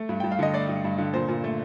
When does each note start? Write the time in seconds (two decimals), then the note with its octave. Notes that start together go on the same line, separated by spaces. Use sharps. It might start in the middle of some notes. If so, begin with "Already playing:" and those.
Already playing: A3
0.09 G2
0.20 G2 G5
0.32 F5
0.39 D3 D#5
0.54 A3 D5
0.69 G2
0.84 G2
0.98 D3
1.14 A#2 C5
1.28 A#2
1.44 A3